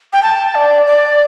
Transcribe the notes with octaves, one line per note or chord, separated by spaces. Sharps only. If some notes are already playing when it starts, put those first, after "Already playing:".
G5
A5
D5
D5